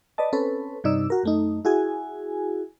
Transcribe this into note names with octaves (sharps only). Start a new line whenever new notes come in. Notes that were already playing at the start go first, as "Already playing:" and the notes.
B4 D5 D#5 A5
C4 C#4 A4 B4
G2 C3 D#4 D5 E6
F#4 A#4
F#2 A3 D#4
E4 F#4 G#4 G#5